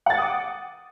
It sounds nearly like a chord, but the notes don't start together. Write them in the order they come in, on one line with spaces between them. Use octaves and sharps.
F#5 A6 G5 D#6 D6